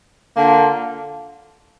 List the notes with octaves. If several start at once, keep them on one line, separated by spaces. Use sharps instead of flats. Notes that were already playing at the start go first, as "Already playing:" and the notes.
D3 A#3 F4